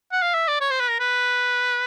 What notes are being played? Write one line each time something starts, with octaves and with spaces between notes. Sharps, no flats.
F#5
F5
E5
D5
C#5
C5
B4
A#4
B4